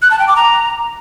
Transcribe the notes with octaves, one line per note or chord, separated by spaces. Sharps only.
F#6
A5
G5
D6
A#5